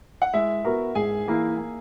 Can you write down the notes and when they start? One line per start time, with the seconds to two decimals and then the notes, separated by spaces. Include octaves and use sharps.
0.22 F#5
0.33 G#3 E4 E5
0.65 B3 F#4 A#4
0.95 G#2 G#4 G#5
1.27 E3 A#3 E4
1.58 A#3